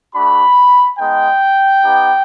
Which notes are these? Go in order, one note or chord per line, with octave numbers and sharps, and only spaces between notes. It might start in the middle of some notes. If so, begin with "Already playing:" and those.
A3 D4 F#4 B5
G#3 B3 D#4 G5
B3 D#4 G4